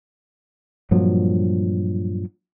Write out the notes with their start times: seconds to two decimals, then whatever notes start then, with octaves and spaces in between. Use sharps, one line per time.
0.91 G2 A#2 F3 F#3